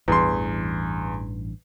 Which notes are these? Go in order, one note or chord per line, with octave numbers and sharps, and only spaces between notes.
A1 E2 G2 E3 C6